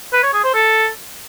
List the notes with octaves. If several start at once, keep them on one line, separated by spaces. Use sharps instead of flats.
B4
C#5
G#4
C5
A4